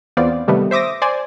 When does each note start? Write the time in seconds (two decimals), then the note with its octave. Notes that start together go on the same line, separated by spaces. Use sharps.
0.17 E2 B3 C4 F4 D5
0.48 C3 D#3 G3 A3 B3
0.71 C5 E5 D6 D#6 A#6
1.02 C5 D5 G#5